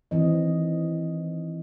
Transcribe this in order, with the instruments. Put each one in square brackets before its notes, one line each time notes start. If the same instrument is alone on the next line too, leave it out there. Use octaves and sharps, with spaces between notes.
[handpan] D#3 E3 C4 D#5